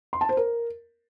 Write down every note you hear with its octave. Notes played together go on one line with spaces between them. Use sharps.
C6
A5
C5
A#4